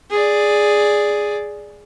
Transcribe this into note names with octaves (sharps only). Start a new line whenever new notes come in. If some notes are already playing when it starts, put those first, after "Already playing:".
G#4 D5